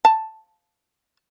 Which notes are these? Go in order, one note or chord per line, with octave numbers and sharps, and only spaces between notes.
A5